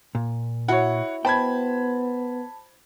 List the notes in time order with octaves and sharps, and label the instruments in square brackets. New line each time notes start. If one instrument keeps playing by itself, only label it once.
[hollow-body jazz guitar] A#2
[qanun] E4 F#4 [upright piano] C#5 F#5
[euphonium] B3 [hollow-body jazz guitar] C5 G5 [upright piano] A5 B5 G#6